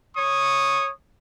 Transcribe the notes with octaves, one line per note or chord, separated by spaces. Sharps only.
C#5 C#6 D#6